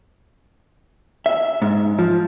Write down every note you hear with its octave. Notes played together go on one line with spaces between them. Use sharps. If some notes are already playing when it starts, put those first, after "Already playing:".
E5
G#2
F3